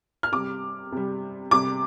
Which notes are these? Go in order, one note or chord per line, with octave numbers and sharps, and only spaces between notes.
F6
C3 G3 D6
C3 G3
C3 G3 D6